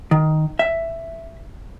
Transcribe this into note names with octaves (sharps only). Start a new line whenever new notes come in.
D#3
E5